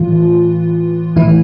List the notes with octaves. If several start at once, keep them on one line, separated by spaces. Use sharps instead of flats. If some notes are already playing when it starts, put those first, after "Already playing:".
Already playing: A2 E3 F4
A2 E3 E4